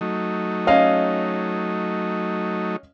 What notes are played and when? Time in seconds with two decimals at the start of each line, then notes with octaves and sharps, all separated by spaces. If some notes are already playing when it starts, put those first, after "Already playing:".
0.01 F#3 A3 D#4
0.67 C#4 D#5 F5